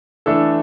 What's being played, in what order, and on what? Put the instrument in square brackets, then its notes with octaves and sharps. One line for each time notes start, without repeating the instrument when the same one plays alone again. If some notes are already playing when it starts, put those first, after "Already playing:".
[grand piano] E3 A3 D4 A4